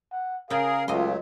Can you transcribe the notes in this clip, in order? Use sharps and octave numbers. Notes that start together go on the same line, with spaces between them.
F#5
C#3 G#4 A#4 F5 G5
C#2 F#3 A3 F4 D#5 C6